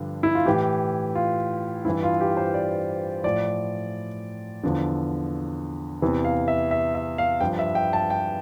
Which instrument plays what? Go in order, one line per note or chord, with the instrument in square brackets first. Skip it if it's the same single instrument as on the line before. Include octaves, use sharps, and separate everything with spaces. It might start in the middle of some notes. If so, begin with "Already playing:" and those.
Already playing: [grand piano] G2 D3 F3
E4
F4
A2 E3 G4
F4
G2 E3 E4
F4
G4
C5
D5
A2 F3 D5
E2 D3 F3
E2 C3 E3
F5
E5
E5
E5
F5
G2 F3 G5
E5
G5
A5
G5